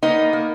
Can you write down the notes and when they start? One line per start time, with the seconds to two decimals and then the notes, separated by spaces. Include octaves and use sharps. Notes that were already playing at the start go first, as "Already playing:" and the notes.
0.03 A#3 B3 D#4
0.18 A#3
0.33 A#3